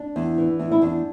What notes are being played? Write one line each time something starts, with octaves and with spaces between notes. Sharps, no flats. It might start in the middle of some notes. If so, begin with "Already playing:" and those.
Already playing: D4
E2
E3
E2
E4
E2 D4